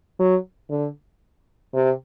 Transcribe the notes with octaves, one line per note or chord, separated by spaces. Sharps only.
F#3
D3
C3